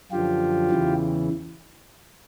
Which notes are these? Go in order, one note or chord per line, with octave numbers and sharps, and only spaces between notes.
F#2 D3 F3 F4 G4
E2 C#3 E3